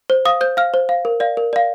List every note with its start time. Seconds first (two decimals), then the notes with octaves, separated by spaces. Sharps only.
0.10 C5
0.25 F5 D#6
0.41 C5 G6
0.57 F5 F6
0.74 C5
0.89 F5
1.05 A#4
1.20 D5 F5
1.37 A#4
1.53 D5 F5